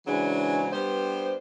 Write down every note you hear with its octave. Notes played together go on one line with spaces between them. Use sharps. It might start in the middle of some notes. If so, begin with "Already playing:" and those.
C#3 E3 F#3 G#3 C4 D4
G2 G3 B3 C5